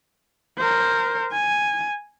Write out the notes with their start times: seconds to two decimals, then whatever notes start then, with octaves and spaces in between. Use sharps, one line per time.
0.57 A#4 C5
1.32 G#5